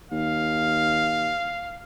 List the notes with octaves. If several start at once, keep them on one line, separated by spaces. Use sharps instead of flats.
D#2 F5